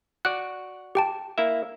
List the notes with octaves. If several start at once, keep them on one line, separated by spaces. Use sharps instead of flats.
F#4 D5 F#6
G4 G5 A5
A#3 E4 E5